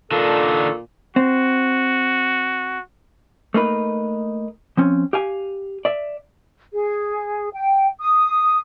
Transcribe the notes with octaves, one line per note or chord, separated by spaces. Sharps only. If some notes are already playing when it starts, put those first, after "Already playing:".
A#2 D#3 D4 A4
C4 F#4
A3 A#3 D#4 B4
F3 C4 C#4
G4 F5 G#5
D5 E5
G#4
G5
D#6